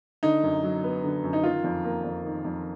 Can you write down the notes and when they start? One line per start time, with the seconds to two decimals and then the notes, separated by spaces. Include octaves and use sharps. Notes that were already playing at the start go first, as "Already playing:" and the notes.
0.23 D3 D#4
0.43 F#2
0.63 F#3
0.84 B3
1.04 D3
1.24 F#2
1.33 D#4
1.43 D#3 F4
1.64 F2
1.84 A#3
2.04 F2
2.24 D#3
2.45 F2